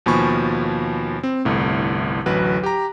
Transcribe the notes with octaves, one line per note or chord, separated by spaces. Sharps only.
D#2 B2 F3 G#5 B5 C#6
C4
G1 C2 A2
A1 D2 F#3 B4 F#6
G4 A#5